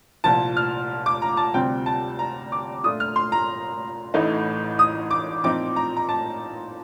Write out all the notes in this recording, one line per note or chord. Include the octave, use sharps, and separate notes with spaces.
C2 A#2 F3 A5
F6
D6
A#5
A5
D2 C3 G3 C4 F4 G5
A5
A#5
D6
A#2 A3 D4 F4 D#6
F6
C6
A#5
A1 A2 A3 D#4
D#6
D6
A#2 F3 C4 D#4 D6
A#5
A#5
A5